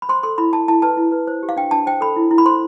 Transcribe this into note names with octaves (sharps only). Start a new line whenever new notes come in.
B5
C5 C6
A4 C6
E4 B5
E4 A5
E4 A5
B4 A5
E4
B4
C5
G4
F5
D4 G5
D4 A5
C5 G5
A4 B5
E4
E4
B5
C5 C6